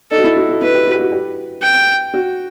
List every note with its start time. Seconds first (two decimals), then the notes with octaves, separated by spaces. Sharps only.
0.11 D#4 A4
0.18 F#4
0.24 E4
0.37 F#4
0.49 F#4
0.62 E4 B4
0.75 G4
0.87 F#4
0.94 G4
1.00 F#4
1.12 G4
1.62 G5
2.14 F#4